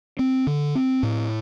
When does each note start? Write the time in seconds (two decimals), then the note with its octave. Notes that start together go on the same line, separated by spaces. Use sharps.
0.19 C4
0.47 D3
0.75 C4
1.03 A2